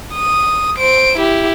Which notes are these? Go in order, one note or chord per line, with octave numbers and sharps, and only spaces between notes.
D#6
C5 D7
E4 G4